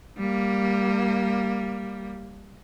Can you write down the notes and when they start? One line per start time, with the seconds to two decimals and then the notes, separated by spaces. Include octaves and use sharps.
0.18 G3 A#3